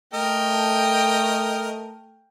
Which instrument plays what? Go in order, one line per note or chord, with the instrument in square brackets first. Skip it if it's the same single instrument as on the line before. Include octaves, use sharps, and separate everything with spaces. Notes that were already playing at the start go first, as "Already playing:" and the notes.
[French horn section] A3 [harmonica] A#4 D#5 [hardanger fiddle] G5